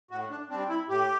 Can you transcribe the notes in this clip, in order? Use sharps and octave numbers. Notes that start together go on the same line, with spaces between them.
A2 F#4
D4
G3 C4 D4
E4
A2 G4